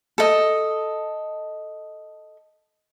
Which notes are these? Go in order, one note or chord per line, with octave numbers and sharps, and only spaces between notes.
A4 D#5